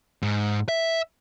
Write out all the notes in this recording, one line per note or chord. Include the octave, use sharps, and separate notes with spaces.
G#2
E5